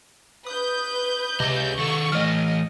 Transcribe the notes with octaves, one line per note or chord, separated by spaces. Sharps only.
B4 D#6 G6
C#2 C3 D#5
D#3 A4 C#6
E3 A3 D#5 F6